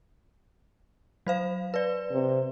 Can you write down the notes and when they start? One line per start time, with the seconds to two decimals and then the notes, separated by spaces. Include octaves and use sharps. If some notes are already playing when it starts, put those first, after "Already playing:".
1.27 F#3 C5 F5
1.74 B4 D5
2.12 C3